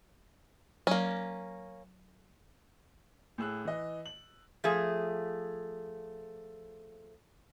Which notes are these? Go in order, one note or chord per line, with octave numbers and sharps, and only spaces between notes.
F#3 A#3 C#4
A2 G#4 E6 F#6
E3 D#5
F#7
F3 A3 G#4